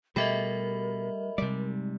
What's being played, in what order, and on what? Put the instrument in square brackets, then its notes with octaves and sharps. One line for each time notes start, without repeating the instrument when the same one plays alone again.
[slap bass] B2 [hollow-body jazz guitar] G3 A3 G4 [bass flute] A#4 [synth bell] D#5 E5 B5
[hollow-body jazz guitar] G#2 D5 [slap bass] C3 G3